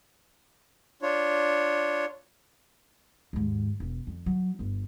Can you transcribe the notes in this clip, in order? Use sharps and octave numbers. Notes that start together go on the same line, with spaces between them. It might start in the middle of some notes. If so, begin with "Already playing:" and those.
D4 F4 C#5
D#2 G#2
E1
F2
F#3
G1 F4